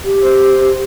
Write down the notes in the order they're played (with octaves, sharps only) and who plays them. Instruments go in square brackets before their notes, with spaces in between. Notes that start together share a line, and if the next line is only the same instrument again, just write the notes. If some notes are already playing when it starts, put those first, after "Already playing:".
[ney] G4
[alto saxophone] C5